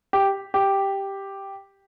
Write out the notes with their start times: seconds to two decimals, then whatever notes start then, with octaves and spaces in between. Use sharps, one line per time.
0.13 G4
0.54 G4